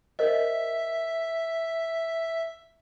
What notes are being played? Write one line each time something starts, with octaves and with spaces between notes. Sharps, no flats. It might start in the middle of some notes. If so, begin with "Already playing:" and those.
A#4 C5 D#5 E5